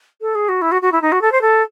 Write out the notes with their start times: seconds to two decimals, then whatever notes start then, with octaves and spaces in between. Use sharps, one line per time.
0.21 A4
0.35 G#4
0.49 F#4
0.62 E4
0.72 F#4
0.82 F#4
0.92 E4
1.02 D#4
1.12 F#4
1.21 A4
1.32 C5
1.41 A4